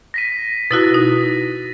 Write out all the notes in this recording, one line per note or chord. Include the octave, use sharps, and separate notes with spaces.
A#6 B6 D#7
B2 E4 F#4 A6
D#4